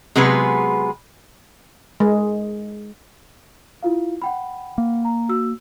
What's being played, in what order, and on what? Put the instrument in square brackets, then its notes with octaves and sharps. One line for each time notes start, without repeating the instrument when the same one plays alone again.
[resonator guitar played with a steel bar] C3 F#3 G#3 B3 G#4 B4
[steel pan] G#3
[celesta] E4 F4 F5
F#5 G5 B5
[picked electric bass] A#3
[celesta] A#5
F#4 E6